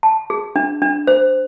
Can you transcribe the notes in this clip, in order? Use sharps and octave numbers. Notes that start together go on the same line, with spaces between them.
A5
G#4
D4
D4
C5